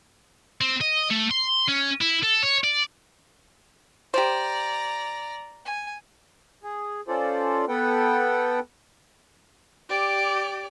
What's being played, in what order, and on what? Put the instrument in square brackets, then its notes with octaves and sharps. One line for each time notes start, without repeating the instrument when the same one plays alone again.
[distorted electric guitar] C4
D#5
A3
C6
C#4
E4
A4
C#5
D5
[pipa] G4 C5 [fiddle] D5 A#5
[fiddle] G#5
[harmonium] G#4
C#4 F4 A4 C5 D5
B3 A4 B4 F#5 G5
[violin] G4 D5